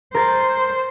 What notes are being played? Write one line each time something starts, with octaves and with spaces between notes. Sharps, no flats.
A#4 C5 A6 C7